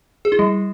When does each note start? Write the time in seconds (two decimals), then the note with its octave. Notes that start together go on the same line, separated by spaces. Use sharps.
0.25 G#4
0.32 E4
0.39 G3